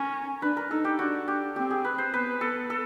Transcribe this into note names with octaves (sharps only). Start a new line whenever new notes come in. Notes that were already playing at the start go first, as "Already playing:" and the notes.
Already playing: C#4 A#4
D4 B4
A#4
D#4 A4
G4
D4 F#4
G4
C4 G4
G#4
B4
C5
B3 B4
A4
A4